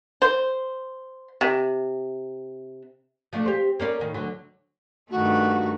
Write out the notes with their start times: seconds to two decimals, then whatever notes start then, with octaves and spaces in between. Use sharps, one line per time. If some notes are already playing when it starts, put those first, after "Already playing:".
0.22 C5
1.41 C3
3.33 F3 A3 D4
3.45 C4 G4
3.80 A#3 C#4 D5
3.99 A2 D#3
4.14 D2 D3 F#3
5.11 G2 D#3 A3 F#4